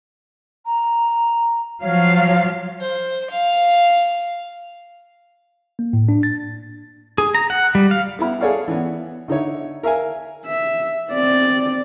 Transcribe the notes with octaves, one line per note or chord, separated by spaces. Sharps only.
A#5
F3 F#3 C#5 F5
C5
F5
A#3
A2
D4
A6
G#4
A#5
F#5
G3
F5
B3 E4 B5
G#4 A4 C#5 D5 F5 F#5
E3 B3
D3 D#4 E4 C#5
A#4 E5 F5 G#5
E5
C4 D5